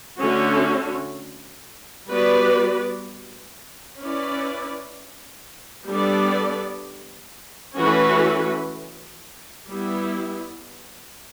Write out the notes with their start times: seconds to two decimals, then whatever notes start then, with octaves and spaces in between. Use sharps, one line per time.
0.20 D3 A3 C#4 F#4
2.09 G3 B3 F#4 B4 D5
4.00 C#4 E4 B4 D5
5.89 G3 B3 D4 A4 D5
7.80 E3 A3 C#4 F#4 B4
9.69 G3 B3 E4